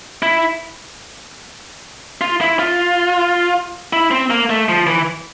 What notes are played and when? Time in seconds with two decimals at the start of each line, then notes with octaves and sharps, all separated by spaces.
0.22 E4
2.21 F4
2.41 E4
2.59 F4
3.93 E4
4.11 C4
4.30 A#3
4.50 A3
4.69 F3
4.87 E3